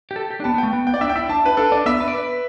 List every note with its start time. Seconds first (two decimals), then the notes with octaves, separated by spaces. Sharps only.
0.11 G4
0.16 A4
0.30 G4
0.40 D4
0.44 B3 A5
0.54 B3
0.58 A3 G5
0.73 B3
0.87 G5
0.94 D5
1.01 D4 E5
1.10 G5
1.16 E4 E5
1.29 D4 A5
1.46 B4
1.57 D4 A4
1.72 D4 D5
1.86 B3 E5
2.01 B4
2.08 D5
2.15 B4